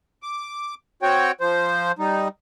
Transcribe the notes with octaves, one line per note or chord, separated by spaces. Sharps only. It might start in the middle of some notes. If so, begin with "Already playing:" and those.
D6
C4 F#4 C#5 G5
F3 C5
G3 D#4